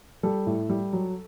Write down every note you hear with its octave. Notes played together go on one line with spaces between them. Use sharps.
G3 A4
A2
G3
F#3